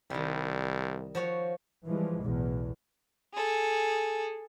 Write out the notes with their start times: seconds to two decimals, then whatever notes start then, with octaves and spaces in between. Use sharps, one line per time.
0.10 C2 D#3 G3
1.15 F3 F#4 C#5
1.87 E3 F3 G3 G#3
2.21 B1 E2 A2
3.34 G#4 A4